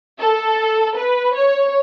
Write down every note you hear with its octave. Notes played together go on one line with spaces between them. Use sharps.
A4
B4
C#5